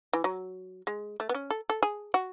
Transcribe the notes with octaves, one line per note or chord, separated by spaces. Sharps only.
E3
F#3
G#3
A3
B3
C#4
A4
A4
G#4
F#4